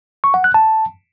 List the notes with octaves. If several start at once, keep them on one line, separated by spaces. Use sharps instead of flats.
C#6
F#5
F#6
A5